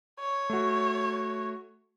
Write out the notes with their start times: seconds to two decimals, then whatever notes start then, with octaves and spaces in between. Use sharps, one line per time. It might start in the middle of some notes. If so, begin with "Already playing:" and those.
0.20 C#5
0.50 A3 F#4